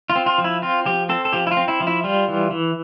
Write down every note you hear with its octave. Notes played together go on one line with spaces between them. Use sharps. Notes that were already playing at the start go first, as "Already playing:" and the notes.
F4
C4
F4
F3
E4
C4 F4
F3 G4
C4 A4
A4
F3 G4
E4
F4
C4
E4
F3
E4
G3 F4
E3
E3